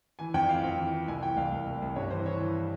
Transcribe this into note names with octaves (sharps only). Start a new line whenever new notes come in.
E3 G#5
F2 G5
E3 F5
F2 G5
E3
E3
C2 G#5
E3 G5
C2 F5
C2
C2
C2
G2 C#5
E3 C5
E3 C#5
E3